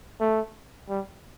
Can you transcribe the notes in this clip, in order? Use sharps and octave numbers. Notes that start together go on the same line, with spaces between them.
A3
G3